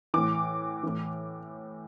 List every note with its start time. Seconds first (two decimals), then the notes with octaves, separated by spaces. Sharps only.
0.14 A2 E3 D6
0.83 A2 E3